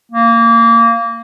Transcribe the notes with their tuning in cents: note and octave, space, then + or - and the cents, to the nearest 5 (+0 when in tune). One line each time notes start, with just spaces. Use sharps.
A#3 -15